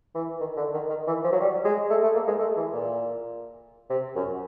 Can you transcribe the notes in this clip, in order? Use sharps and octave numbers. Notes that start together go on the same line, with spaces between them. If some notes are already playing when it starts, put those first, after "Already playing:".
E3
D#3
D3
D#3
D#3
E3
F3
F#3
G3
G#3
A3
A3
A#3
G#3
A3
E3
A#2
C3
F#2